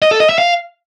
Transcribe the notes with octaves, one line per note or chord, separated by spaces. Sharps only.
D#5
A4
D#5
E5
F5